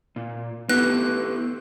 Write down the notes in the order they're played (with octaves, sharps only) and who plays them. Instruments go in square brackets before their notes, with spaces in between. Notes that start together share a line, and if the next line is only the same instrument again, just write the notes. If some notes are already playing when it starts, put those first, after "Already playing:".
[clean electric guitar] A#2
[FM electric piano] B3 [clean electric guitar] E4 G4 A4 [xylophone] F#6